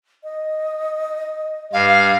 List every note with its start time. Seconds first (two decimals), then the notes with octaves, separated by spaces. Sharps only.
0.24 D#5
1.73 G2 F5